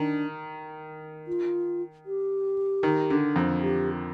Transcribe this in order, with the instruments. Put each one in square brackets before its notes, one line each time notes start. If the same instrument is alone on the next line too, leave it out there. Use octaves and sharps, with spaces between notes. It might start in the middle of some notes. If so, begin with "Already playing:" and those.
Already playing: [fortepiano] D#3 [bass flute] D4
[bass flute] F4
G4
[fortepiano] D#3
D3
F2
[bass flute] G4